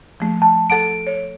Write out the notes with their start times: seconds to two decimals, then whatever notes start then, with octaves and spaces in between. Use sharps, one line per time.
0.20 F3 A3
0.42 A5
0.70 A4 F#5 A5 D7
1.07 C#5